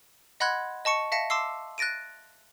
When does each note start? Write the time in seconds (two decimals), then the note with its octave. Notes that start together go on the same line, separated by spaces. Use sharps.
0.40 D#5 F#5 B5 C6 F#6 G#6
0.85 D#5 A5 C#6 C#7
1.12 E5 F5 A5 A#6 C#7
1.30 A5 C6 D6 E6 C7
1.78 F#6 A6 A#6 D7 D#7